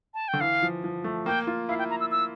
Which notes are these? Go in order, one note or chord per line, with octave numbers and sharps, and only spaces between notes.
A5
G5
D3
E3 F5
F3
F3
A3
A#3 G5
F4
E4 F5
G5
A#5
E6
E6